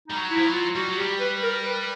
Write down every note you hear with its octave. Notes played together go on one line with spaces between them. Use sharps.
G3 D#4
F#3
E4
F3
F#3
F4
G3 F#4
F#3
G3 G4
B4
A#4
B4